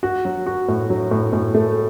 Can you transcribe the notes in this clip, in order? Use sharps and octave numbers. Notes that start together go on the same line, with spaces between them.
F#4
F#3
F#4
A2
F#3
A2
A2
A3